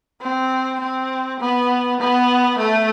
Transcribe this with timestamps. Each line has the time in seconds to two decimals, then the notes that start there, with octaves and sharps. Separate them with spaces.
0.22 C4
0.81 C4
1.40 B3
2.00 B3
2.59 A3